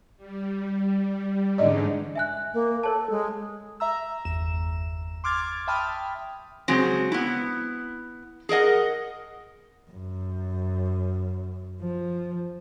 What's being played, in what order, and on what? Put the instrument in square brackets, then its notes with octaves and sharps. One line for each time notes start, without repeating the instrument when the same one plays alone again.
[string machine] G3
[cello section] G#2 D3 [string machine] E3 C#4 D#4 [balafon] D5 D#5
[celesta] E5 G#5 F#6
[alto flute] A#3
[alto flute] A4 [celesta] C#5 A5
[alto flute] G#3
[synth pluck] E5 A#5 E6
G1 E2 E7
C6 D6 F6 G#6 A6
E5 G5 A5 B5 D#6 F6
[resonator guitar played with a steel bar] C#3 F#3 G#3 C4
B3 E4
G#4 A#4 D#5 F#5
[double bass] F#2
F3